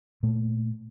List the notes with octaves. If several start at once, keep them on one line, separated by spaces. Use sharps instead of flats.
A#2 A3